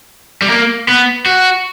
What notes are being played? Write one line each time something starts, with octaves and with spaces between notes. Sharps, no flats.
G3
A#3
B3
F#4